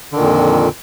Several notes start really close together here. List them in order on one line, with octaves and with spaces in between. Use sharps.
D3 D#3 A#2 F2